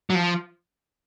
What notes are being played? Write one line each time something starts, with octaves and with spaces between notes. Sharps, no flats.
F#3
F3